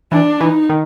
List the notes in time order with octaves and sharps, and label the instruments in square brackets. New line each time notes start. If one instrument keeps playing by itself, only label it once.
[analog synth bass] E3 [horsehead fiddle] D4
[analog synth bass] E3 [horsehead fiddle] D#4
[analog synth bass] D#3